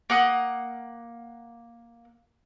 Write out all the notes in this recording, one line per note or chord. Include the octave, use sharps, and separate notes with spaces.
A#3 F#5 D#6